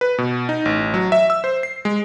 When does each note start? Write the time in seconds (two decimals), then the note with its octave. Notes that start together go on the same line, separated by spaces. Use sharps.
0.01 B4
0.18 B2
0.49 D#4
0.65 A1
0.94 F#3
1.12 E5
1.30 E6
1.44 C5
1.63 C7
1.85 G#3